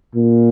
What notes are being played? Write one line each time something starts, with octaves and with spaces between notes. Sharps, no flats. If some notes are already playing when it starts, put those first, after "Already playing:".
A#2